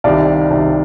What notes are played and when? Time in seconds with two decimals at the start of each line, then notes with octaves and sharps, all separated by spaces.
0.04 C2 C3 D#3 D5 F5
0.50 C2 C3 D#3